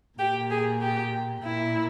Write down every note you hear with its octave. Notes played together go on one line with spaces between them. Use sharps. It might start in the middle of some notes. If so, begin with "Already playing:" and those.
A#2 G4
G#4
G4
A#2 E4